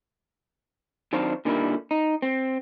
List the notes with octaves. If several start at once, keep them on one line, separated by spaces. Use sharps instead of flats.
D#3 F#3 C4 D4 C5 F5
A#2 D3 D#3 G3 A#3 E4
D#4
C4